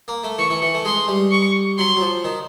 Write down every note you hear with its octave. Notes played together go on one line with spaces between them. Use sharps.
A#3
A3
E3 C#6
E3
E3
A3
G#3 C6
G3
C#6
F#3 C6
F#3
F3
D#3